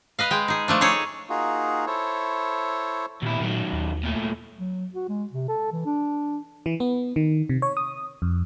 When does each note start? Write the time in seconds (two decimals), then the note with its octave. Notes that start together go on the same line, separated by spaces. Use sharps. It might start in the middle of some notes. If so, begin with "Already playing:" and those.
0.19 B4 D#5 F5
0.31 G#3 G5
0.48 D#4 G#4
0.68 F3 A3 D4
0.81 D#4 G#4 A4 C#5
1.30 A#3 D#4 F4 F#4 G#4
1.87 E4 A4 C5 C#5
3.22 D#2 A#2 E4
3.41 A#2 D#3 F#3
3.73 D#2
4.03 A#2 A3
4.59 F#3
4.94 F#4
5.09 G#3
5.32 C3
5.48 A4
5.72 E3
5.85 D4
6.66 E3
6.80 B3
7.16 D#3
7.49 C3
7.62 C#5
7.77 D#6
8.22 F2